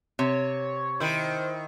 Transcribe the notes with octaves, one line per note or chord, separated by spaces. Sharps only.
C3 C#5
D#3 E4 C5